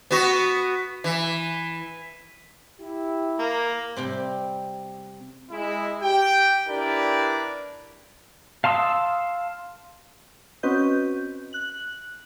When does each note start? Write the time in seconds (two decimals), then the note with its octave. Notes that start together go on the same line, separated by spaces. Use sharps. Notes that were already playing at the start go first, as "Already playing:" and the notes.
0.11 B3 F#4
1.04 E3
2.80 E4 G4
3.39 A#3
3.97 C3 G3 C4
5.51 G#3 E4
6.01 G4 G5
6.68 D4 E4 G4 A#4 B4 D5
8.64 F5 A5 C6 D#6 E6
10.63 C4 C#4 F#4 B4 D#5 G6
11.53 F#6 F#7